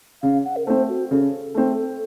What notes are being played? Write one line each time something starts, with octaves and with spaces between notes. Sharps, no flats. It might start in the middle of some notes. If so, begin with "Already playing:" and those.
C#3 F5
F#5
A#4
A3 C4 C5
F#4
C#3 A4
A3 C4